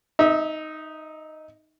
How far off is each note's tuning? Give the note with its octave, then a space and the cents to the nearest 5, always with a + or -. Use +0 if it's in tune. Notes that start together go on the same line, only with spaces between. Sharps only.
D#4 +0 E5 -30